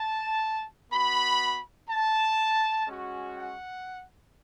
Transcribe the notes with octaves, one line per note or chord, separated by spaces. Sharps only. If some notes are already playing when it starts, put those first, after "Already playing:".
Already playing: A5
B3 F#4 B5
A5
G#3 C#4 F#4
F#5